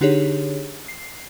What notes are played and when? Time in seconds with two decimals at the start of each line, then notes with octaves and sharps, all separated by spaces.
0.01 D3 D4 D#4 G4 G#4 C#5
0.88 C7